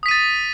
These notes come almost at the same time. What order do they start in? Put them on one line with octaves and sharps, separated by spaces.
D#6 B6 D#7 A6